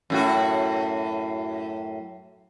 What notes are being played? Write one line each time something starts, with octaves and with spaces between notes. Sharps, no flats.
F#2 A2 F#4